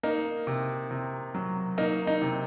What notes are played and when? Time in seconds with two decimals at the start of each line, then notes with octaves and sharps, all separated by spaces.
0.03 A#3 D#4
0.47 C3
0.91 C3
1.35 F#3
1.78 A#3 D#4
2.07 D#4
2.22 C3